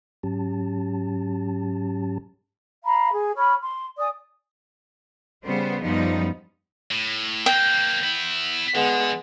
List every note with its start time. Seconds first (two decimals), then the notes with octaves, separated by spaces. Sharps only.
0.23 G#2 F#3 C#4 G4 A5
2.84 F5 A#5 B5
3.13 G#4
3.36 C#5 B5 C#6 F6
3.61 C6
3.97 D5 G#5 D#6
5.45 C#3 G3 B3 C5
5.83 F#2 F3 G3 B3 D#4
6.91 A2
7.46 A#3 C4 G5
8.03 B3 E4
8.75 D3 G#3 B3